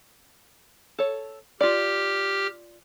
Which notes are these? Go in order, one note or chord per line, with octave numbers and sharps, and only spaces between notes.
A4 C#5
F4 G4 D5 F6